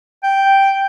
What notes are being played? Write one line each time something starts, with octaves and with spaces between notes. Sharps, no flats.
G5